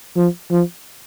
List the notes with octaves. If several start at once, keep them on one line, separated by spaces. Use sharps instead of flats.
F3
F3